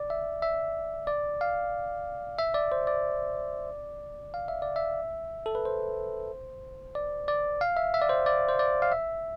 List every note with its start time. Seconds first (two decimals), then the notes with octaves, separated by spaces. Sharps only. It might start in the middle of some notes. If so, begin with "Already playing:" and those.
Already playing: D5
0.10 E5
0.42 E5
1.07 D5
1.41 F5
2.39 E5
2.54 D5
2.72 C5
2.87 D5
4.34 F5
4.48 E5
4.62 D5
4.76 E5
5.46 A4
5.55 B4
5.65 C5
6.95 D5
7.28 D5
7.61 F5
7.77 E5
7.94 E5
8.02 D5
8.09 C5
8.26 D5
8.49 C5
8.59 D5
8.82 F5
8.92 E5